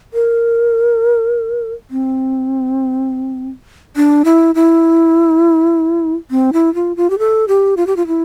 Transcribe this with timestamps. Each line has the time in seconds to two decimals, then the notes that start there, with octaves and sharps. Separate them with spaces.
0.14 A#4
1.91 C4
3.96 D4
4.25 E4
4.55 E4
6.31 C4
6.53 E4
6.75 F4
6.97 F4
7.10 G4
7.19 A4
7.48 G4
7.77 F4
7.87 G4
7.97 F4
8.07 E4